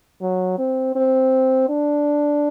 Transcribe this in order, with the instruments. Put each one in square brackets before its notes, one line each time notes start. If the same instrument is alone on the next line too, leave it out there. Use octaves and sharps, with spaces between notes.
[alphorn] F#3
C4
C4
D4